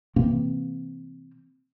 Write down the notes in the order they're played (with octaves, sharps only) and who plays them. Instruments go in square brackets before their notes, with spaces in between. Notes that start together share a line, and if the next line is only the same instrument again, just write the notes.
[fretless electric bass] C3 E3 A#3 C4